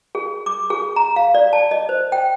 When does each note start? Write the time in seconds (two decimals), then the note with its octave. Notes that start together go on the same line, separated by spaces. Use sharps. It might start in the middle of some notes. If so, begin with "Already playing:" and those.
0.15 G#4
0.46 D6
0.70 G#4
0.96 A#5
1.16 F5
1.35 D5
1.53 A5
1.71 D#5
1.89 C5
2.12 G5